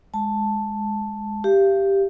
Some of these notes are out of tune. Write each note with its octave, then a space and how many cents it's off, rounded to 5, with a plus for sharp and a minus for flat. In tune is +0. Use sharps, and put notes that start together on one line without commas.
G#3 +0 A5 +0
G4 +0 F5 -40